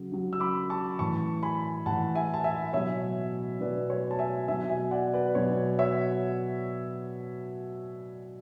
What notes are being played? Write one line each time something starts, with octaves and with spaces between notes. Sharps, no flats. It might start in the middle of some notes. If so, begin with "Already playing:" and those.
Already playing: C#3 F#3
C#3 F#3
E6
B5 D6
A5 C#6
A2 E3 A5 C#6
G#5 B5
A2 E3 F#5 A5
E5 G#5
A5
E5 G#5
B2 F#3 C#5 E5
B2 F#3 B4 D5
C#5
A5
E5 G#5
B2 F#3 E5 G#5
E5 G#5
D5 F#5
B4 D5
B2 F#3 C#5
C#5 E5